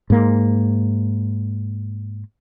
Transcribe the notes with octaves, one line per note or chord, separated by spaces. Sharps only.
G#2 A#3